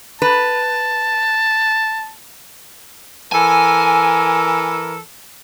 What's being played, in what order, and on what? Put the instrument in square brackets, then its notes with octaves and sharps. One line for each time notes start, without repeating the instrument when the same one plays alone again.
[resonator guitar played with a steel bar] B4 [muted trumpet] A5
[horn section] E3 A4 A#4 [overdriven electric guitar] G#5